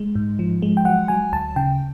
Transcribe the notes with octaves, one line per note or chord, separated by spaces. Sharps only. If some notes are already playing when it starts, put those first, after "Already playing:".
Already playing: G#3
G#2
F3
G#3
G5
F#3 F#5
F#3 G#5
D2 A5
C#3 G5